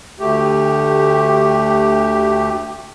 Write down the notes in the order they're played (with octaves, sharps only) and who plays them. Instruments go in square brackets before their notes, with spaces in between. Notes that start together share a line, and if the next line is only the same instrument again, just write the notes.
[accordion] D2 A3 G4